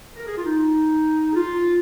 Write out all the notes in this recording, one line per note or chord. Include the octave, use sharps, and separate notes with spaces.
A#4
G#4
F4
D#4
G#4
F4